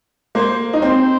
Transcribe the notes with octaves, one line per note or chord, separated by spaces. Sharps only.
A#3 C5
D#4
C4 C5